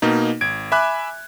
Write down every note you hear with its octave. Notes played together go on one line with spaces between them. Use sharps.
B2 A#3 D#4
G#1 G#6 D7
E5 G#5 B5 D6 F#6